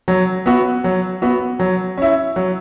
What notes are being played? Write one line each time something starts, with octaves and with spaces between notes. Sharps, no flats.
F#3
B3 F#4
F#3
B3 F#4
F#3
C#4 E4
F#3